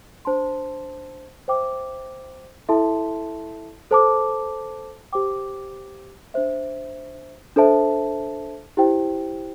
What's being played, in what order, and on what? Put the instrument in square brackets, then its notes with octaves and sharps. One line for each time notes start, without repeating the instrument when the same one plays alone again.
[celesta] D4 C5 A5 C6
C5 E5 G5 D6
E4 A4 E5 A5 C6
A4 C5 A5 D6
G4 C5 G5 D6
D4 C5 E5
D4 A4 C5 E5 A5
E4 G4 C5 G5